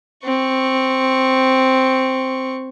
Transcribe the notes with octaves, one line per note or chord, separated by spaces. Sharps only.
C4 C#6